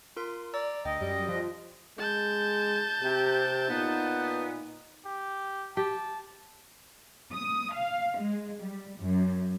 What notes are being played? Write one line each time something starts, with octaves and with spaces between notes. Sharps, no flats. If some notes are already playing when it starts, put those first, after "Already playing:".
F4 A#4 C6
D5 A#5 E6 A6
D2 D#5 G5
F#2 G3
F3 F4
G#3 A5 G6
C3 G4
A#2 B3 D#4
G4
G4 A5
D#6
F5
G#3
G3
F#2